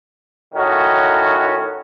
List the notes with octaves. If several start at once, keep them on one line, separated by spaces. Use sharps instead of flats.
A2 D#3 C#4 D#4 F#4